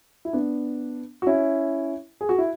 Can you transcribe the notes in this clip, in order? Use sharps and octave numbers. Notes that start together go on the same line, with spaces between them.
E4
B3 D4
F#4
C#4 E4
G#4
F#4
E4